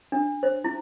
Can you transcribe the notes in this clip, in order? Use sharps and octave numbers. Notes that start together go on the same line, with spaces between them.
D4
C5
E4